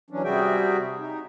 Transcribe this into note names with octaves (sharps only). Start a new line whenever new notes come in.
E3 F#3 C#4 D4
C3 G3 F#4 G#4 E5 G5
D#4